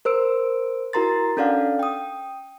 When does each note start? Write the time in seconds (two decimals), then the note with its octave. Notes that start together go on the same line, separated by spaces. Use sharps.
0.05 A#4 C5 E6 D7
0.93 E4 F#4 A#4 A#5 C6 A6
1.37 C#4 D4 A4 D5 F5 F#5
1.79 G5 D#6